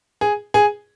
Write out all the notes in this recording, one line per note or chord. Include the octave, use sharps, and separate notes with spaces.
G#4
G#4